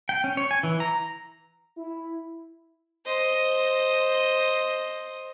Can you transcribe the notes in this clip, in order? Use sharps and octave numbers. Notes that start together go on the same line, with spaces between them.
G5
C#4
C#5
G#5
E3
A#5
E4
C5 D#5